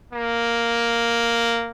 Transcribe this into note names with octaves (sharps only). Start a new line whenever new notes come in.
A#3